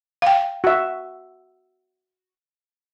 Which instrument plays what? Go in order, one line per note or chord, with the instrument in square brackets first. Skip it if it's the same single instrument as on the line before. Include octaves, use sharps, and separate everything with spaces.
[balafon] F5 G5
[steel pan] F#4 E5